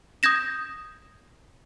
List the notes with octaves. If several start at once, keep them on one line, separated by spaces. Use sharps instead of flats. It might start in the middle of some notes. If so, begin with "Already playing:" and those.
D#6 G6 G#6 A#6 E7